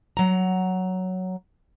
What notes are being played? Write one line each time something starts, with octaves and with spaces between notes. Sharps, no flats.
F#3 F#5 A#5